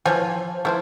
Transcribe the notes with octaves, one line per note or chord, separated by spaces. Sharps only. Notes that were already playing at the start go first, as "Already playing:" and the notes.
E3 F3 C#5 G#5
F3 A3 E4 C5